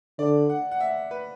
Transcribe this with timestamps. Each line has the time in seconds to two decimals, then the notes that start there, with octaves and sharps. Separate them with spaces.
0.19 D3 D5
0.49 F#5
0.71 F#5
0.80 E5
1.11 B4